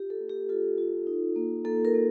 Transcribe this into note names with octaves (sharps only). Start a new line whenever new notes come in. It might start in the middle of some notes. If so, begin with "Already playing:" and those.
Already playing: F4 G4
A4
A#3
G4
F4 A4
F4
D#4
A#3
A#3 A4
A#4
A#3